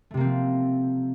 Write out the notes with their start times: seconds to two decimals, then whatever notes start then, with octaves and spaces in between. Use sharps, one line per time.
0.11 A3
0.14 C3
0.17 A#3
0.20 C4
0.24 F3